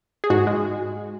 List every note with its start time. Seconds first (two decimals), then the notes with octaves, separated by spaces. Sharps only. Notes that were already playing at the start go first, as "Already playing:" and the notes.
0.24 G#4
0.30 G#2 F#4
0.47 G#3